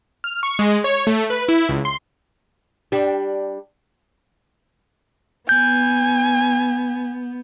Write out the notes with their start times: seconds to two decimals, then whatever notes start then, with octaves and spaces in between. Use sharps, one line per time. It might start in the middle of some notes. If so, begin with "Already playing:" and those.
0.24 F6
0.43 C#6
0.59 G#3
0.84 C#5
1.07 A3
1.30 B4
1.49 E4
1.69 C#2
1.85 C6
2.92 G3 D4
5.49 B3 G#5 G6